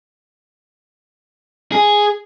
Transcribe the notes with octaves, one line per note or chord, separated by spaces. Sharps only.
G#4